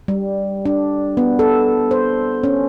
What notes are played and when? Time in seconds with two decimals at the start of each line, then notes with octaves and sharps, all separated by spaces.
0.08 G3
0.65 D4
1.17 B3
1.39 A4
1.91 C5
2.43 C#4